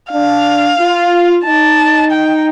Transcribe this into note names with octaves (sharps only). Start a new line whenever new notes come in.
D4 F5
F4
D#4 A5
G5